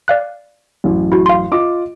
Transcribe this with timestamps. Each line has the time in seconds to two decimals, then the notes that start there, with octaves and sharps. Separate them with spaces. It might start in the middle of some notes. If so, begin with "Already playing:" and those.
0.08 D5 F5 F#6
0.84 A1 F#2
1.12 E4 F#4
1.26 F5 C6
1.52 F4 D#5 D6